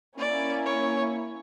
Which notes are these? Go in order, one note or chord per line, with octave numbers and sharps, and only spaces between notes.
A#3 C#4 E4 D5
C#5